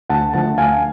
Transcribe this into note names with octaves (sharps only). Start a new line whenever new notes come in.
D2 F#5 A5
D3 F3 A3 F#5 A5
D2 F5 G#5